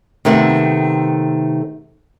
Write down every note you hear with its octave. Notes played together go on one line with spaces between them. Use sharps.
C3 D#3 A3 B3 C4